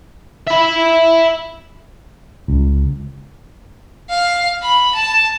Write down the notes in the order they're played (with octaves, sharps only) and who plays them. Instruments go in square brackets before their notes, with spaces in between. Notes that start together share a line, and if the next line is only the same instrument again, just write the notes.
[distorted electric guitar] E5 B5
[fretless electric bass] C#2
[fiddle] F5
B5
A5